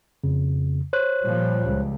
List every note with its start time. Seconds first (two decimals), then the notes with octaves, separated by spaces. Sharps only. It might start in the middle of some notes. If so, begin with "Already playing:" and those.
0.24 F2 C#3
0.93 C5 C#5 F#6
1.23 A#2 F3 G3
1.64 C#2